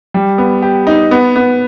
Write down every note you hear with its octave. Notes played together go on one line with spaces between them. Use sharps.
G3
B3
G4
D#4
B3
B3